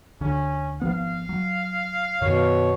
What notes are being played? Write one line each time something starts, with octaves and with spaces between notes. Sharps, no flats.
D2 D3 C#4
G#1 F3 B3 F5
F#3
F#2 B2 D#3 C#5